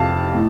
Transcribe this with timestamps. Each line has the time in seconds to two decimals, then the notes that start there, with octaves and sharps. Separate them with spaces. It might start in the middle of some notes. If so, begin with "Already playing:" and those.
Already playing: F2 C3 F5 A5
0.34 A2